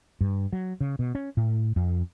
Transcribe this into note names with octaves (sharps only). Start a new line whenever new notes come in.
G2
F#3
C#3
B2
C#4
A2
F2